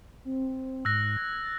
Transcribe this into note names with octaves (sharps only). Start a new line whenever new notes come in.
C4
G#2 E6 F#6 A#6
G#6
A6